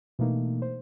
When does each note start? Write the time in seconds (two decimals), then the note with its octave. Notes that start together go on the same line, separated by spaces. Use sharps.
0.19 B2 E3 A3 A#3 D#4
0.62 C5